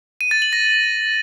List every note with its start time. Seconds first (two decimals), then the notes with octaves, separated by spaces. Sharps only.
0.21 D#7
0.31 A6
0.42 F#7
0.53 A#6